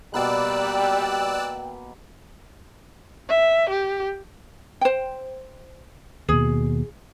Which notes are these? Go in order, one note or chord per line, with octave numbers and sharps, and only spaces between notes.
B2 G3 A#3 B3 D5 G5 E6 F#6
E5
G4
C5 G5
D#2 B2 G#4